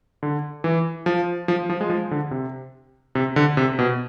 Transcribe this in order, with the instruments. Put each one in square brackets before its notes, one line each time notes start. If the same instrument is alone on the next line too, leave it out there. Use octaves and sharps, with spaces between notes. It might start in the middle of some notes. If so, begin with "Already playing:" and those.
[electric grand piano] D3
E3
F3
F3
F3
G#3
F3
D3
C3
C3
D3
C3
B2